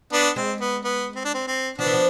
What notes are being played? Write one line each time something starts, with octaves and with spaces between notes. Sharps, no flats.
B3 D4
G#3 C4
B3
B3
C4
D4
C4
C4
F3 B3 D4
E3
F3